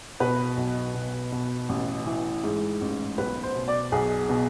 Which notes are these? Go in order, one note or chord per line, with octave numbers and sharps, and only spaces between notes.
B2 B4
B1
B2
B2
A1
E3
G#2
A1
B1 B4
C5
B2
D5
B1 G#4
B2